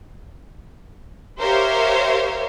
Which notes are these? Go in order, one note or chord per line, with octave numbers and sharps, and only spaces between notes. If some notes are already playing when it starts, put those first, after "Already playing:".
G4 A#4 C5 C#5 E5 F5